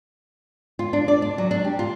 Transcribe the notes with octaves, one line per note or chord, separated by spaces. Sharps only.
F4
D4
D5
D4
F#3
D4
G4
F4